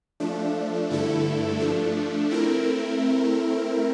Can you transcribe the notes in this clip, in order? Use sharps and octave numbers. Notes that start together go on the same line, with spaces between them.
F3 A3 D4
G2 D3 A3 E4 A4
F3 A3 D4
A3 C4 E4 A#4